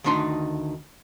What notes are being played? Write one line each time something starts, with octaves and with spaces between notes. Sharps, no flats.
D2 D#3 D4 D#4 C6